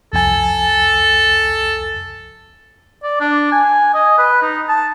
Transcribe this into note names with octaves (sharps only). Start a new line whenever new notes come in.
C2 F2 A4 G#5
D5
D4
G#5
D#5
B4
D#4
A5